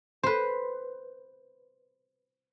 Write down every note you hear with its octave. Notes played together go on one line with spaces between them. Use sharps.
B4 C5